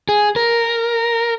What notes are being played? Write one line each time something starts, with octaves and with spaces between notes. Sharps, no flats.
G#4
A#4